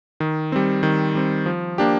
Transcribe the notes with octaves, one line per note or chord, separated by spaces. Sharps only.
D#3
G3 C4
D#3
G3 C4
F3
A#3 D4 G4